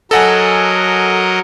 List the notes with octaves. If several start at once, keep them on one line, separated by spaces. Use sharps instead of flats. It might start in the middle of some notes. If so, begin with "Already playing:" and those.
F#3 A4 A#4 D#5 F#5 G#5